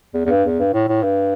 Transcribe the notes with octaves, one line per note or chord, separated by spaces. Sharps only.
E2
E2
G2
E2
G2
A2
A2
G2